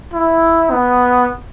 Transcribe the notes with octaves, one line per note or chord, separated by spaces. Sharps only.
E4
B3